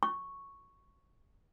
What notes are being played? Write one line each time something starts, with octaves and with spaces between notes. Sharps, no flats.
C#6